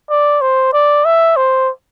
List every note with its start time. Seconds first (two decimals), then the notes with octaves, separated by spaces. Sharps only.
0.10 D5
0.41 C5
0.73 D5
1.05 E5
1.37 C5